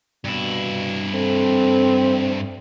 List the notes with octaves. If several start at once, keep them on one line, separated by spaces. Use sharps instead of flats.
G2 B2 E4
C4 A4